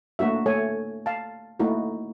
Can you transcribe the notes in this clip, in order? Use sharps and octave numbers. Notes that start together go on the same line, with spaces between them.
A3 A#3 D4 F#4 E5
A3 A4 C#5 G#5
F5 A5
A3 A#3 D#4 E4 F#4